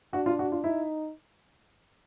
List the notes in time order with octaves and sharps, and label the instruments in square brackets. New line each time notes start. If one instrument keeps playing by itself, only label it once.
[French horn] D4 [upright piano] F#4
[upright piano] F4
F#4
F4
[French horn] D#4 [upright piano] E4